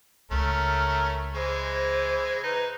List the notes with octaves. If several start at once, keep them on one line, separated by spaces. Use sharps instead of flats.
C#2 C#3 A3 C#4 A#4
E3 G#3 C5
D#4 B4